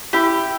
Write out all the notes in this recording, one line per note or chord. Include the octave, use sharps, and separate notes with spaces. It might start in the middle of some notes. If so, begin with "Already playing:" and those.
E4 G4